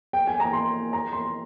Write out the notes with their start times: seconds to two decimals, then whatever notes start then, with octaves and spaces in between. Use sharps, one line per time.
0.13 G5
0.27 G#5
0.40 A#5
0.53 C6
0.93 A#5
1.13 C6